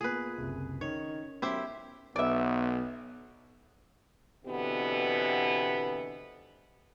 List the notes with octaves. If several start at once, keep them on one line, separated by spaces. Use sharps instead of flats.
A#2 B3 G#4 B4 G#5
F#1 C2
D#3 C#4 C#5
F#2 B3 E4 G4 C5
B1 B3 D5 E5
B2 D3 E3 B3 C4 G4